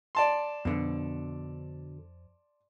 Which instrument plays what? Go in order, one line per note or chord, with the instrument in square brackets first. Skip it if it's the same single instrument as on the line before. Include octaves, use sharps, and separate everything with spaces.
[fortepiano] D5 A5 C6
[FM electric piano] F2 [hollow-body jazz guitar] B2 D3